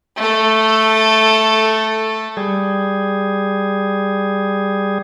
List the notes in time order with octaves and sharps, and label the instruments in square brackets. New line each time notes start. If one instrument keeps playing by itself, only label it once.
[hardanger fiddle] A3 A4
[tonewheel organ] G3 G#4